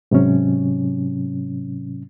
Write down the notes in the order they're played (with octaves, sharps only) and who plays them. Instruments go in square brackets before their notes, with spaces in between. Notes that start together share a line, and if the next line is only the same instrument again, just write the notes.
[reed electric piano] G#2 C3 F#3 C#4